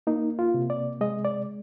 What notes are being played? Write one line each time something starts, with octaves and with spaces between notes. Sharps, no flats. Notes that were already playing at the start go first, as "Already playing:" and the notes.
A#3 D#4
F4
C3
D5
G#3 D#5
D5